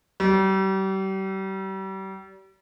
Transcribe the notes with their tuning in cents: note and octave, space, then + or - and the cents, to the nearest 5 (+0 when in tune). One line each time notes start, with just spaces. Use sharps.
G3 -35